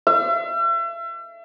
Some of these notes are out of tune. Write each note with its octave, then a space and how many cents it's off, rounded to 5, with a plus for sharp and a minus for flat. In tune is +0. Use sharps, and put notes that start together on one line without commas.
E5 +40